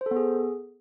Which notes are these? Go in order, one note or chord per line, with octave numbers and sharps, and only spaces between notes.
C5
A4
B3
G#4